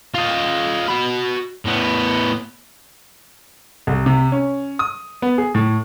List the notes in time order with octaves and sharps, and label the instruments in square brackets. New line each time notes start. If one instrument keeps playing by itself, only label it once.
[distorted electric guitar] F4 D#5
F#4 B5
A2 B3
[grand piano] C2
C3
C#4
D#6
B3
G#4
A2